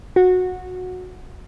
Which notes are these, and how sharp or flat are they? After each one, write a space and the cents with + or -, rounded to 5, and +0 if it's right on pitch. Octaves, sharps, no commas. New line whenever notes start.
F#4 -15